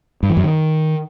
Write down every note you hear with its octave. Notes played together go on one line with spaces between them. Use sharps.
G2
E3
F#2
D#3